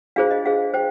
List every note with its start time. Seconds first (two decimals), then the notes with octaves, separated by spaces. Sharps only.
0.16 D4 F4 G#4 C5 F5
0.31 D#5
0.45 D4 G#4 C5 F5
0.74 C5 G5